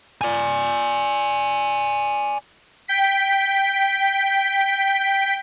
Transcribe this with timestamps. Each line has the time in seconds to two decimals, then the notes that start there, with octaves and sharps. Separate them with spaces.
0.21 D5 G#5
2.88 G5 B6